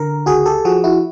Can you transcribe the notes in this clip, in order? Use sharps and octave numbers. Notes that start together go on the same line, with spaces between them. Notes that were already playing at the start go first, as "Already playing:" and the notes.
Already playing: D3 A#4
C#2 F#4 G#4
G4 A4
F3 F#4 G#4
E4 F#4